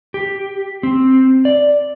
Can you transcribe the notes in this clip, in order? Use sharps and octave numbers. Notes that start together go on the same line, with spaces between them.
G4
C4
D5